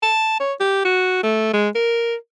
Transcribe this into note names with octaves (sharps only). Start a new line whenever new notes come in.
A5
C#5
G4
F#4
A3
G#3
A#4